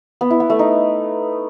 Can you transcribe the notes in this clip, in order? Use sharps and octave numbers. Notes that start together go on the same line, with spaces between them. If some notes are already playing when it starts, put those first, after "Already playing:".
B3
E4
B3
A3
D#4